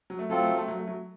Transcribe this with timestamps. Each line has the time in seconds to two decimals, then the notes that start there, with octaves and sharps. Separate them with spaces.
0.10 F#3
0.19 A3
0.30 F#3 C4 F4 A4
0.38 A3
0.48 F#3
0.58 A3
0.68 F#3
0.78 A3
0.88 F#3